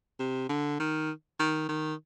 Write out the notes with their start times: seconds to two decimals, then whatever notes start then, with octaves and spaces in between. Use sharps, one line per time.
0.19 C3
0.49 D3
0.80 D#3
1.39 D#3
1.69 D#3